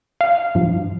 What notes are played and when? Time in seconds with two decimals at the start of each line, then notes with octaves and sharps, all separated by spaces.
0.21 F5
0.55 G2 F3